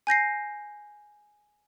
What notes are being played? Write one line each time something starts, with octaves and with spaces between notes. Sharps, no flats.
G#5 G6 A#6 C7